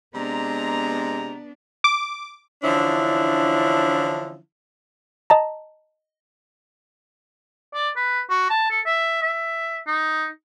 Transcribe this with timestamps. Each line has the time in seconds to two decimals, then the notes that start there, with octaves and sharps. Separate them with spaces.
0.14 C3 G#3 B3 D4 A#5
1.84 D6
2.63 D3 E3 F3 C#4 D4 E4
5.30 D#5 A5 A#5
7.74 D5
7.96 B4
8.30 F#4
8.50 A5
8.71 A4
8.86 E5
9.22 E5
9.87 D#4